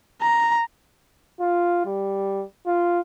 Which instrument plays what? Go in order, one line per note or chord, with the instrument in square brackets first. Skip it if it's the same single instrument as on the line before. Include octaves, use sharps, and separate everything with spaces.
[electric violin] A#5
[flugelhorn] F4
G3
F4